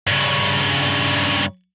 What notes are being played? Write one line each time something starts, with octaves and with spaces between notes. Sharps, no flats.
G2 C#3